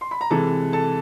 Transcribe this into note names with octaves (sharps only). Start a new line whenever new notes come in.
C6
B5
A#5
C3 E3 G#3 A4 A5
A4 A5